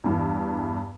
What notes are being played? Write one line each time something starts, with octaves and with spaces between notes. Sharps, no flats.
E2 G2 E3